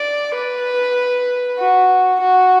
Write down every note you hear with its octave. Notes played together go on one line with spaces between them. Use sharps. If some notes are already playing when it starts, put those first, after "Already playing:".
Already playing: D5
B4
F#4
F#4